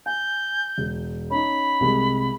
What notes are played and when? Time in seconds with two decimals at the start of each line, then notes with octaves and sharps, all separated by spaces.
0.06 G#5 G6
0.78 E1
1.30 C#4 D#4 B5
1.80 C2 C3 G#3